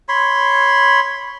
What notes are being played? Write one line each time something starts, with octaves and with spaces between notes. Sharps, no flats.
C#5 B5 C6